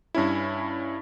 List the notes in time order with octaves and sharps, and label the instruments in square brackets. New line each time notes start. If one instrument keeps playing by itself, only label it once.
[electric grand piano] G2 C#4 E4